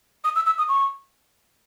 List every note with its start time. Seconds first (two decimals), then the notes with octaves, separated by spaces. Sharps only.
0.24 D#6
0.36 E6
0.46 E6
0.58 D#6
0.69 C#6